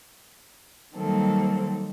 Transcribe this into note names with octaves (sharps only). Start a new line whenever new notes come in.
D#3 F#3 G3 A#3 C4 A4